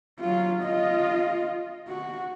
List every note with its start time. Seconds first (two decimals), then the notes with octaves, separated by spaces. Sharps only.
0.20 F#3 F4
0.64 F4 D#5
1.88 F#4